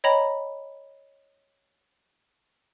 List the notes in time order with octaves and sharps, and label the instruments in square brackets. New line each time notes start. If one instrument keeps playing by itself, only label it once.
[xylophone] C#5 D#5 G5 A#5 B5